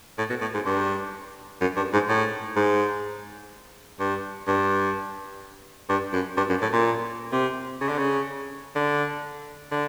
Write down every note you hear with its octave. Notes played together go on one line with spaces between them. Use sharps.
A2
B2
A2
G#2
G2
F#2
G2
G#2
A2
G#2
G2
G2
G2
F#2
G2
F#2
A2
A#2
C3
C#3
D3
C#3
D3
D3